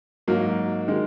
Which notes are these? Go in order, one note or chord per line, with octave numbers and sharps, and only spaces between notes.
G#2 F#3 A#3
D#3 G#3